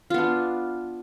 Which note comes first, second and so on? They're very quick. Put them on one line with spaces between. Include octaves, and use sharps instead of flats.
F4 B3 D4